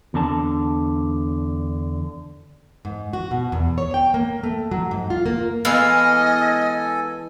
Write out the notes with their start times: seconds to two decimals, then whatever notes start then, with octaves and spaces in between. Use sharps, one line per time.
0.14 E2 D3 A5
2.85 G#2
3.13 F#4
3.31 B2
3.52 E2
3.78 C#5
3.94 G5
4.14 A#3
4.43 A3
4.71 F#3
4.91 G#2
5.10 F4
5.26 A#3
5.65 E3 G#3 B3 A4 D#5 F5 G#5 E6